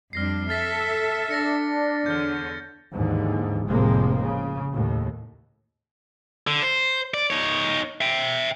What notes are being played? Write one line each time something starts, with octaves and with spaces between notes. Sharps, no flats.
F2 G3 D4 F6 A#6 C7
A4 E5 F6 A6 B6
D4 A6 A#6 C#7
E2 D3 C#5 F6 G6
D#2 G#2 D3 E3
F1 A2 C3 F3 G#3 A#3
C#3
D#2 A2
D3
C5
D5
D#4 C#5
E5 G5